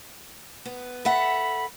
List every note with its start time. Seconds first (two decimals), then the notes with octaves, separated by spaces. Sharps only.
0.65 B3
1.05 A4 E5 F#5 B5